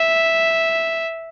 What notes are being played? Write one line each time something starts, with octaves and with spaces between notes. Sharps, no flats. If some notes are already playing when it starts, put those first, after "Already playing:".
Already playing: E5